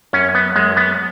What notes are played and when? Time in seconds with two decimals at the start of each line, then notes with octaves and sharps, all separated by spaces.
0.13 F#2 C#4
0.35 B3
0.56 F#2 G#3
0.77 B3